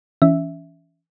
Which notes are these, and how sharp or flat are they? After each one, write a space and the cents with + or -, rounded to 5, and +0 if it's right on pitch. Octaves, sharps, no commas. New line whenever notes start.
E3 +0 C#4 +20 E5 +0